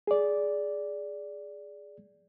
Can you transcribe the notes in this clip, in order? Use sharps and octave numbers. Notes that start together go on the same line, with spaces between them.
G#4 D5